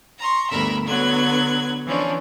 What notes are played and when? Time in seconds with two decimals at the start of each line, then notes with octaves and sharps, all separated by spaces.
0.19 A#5 C6 C#6
0.50 D2 G2 B3 A#4 E5 B5
0.87 D3 F#3 B3 F#6 G#6
1.86 E3 F3 C#4 D4